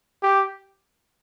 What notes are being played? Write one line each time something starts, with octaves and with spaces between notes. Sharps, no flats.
G4